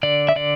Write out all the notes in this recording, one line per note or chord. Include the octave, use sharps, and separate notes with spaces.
D3 D5
E5
D3 D5